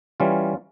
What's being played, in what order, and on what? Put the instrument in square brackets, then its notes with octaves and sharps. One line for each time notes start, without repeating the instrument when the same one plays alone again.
[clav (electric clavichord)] E3 G3 C#4 F4